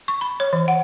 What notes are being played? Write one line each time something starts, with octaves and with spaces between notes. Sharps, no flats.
C#6
B5
C#5
E3
F#5